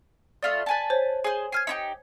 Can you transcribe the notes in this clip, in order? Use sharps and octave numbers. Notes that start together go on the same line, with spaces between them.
A3 F4 D5 D#5
B4 G#5 A5
C5 C#5
G#4 C5 G#5
G#5 F6 G#6 C7
D#4 E4 G4